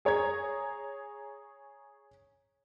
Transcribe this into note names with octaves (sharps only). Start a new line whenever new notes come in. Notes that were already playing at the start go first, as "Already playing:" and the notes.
G#4 C#5 A#5 G#6